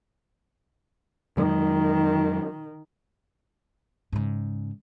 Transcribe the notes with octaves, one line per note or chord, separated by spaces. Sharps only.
F2 D#3 F#3 G#3
G#2 C#3